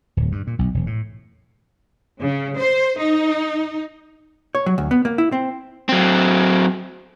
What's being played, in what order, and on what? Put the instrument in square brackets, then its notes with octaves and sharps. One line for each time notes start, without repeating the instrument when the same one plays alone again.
[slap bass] D1
G2
A#2
B1
E1
A2
[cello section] C#3
C5
D#4
[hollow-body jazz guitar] C#5
F#3
D2
B3
A#3
E4
C4
[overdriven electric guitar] F#3 C4